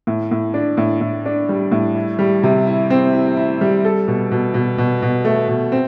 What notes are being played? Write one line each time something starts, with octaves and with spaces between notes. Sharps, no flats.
A2
A2
D4
A2
A2
D4
G3
A2
E4
G3
C3
E4
C4
E4
E4
G3
A4
B2
B2
B2
B2
B2
A3
B2
C4